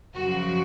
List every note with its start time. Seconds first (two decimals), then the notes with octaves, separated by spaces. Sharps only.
0.15 F#2 C#3 F3 F#4